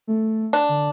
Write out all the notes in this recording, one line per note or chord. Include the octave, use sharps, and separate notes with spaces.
A3
D4
D3